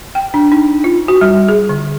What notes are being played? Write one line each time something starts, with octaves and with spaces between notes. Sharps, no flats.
G5
D4
D#4
F4
F#4
G3
G#4
D3